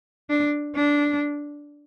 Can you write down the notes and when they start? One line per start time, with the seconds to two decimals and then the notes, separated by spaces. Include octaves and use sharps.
0.30 D4
0.75 D4